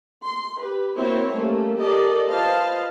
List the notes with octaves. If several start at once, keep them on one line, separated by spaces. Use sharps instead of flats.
C6
G4 B4
A#3 C4 E4 F#4 C5 C#5
G3 A3 A#3 C#4
G4 A4 A#4 D5 D#5
F4 B4 C5 D#5 F5 A5